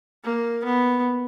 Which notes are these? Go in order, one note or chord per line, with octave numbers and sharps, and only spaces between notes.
A#3
B3